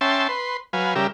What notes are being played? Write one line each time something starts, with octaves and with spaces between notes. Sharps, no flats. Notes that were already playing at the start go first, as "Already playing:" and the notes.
C#4 E5 G5 A5 C6
B4 C6
F#3 B4 F5 G#5
C#3 G3 G4 A#4 E5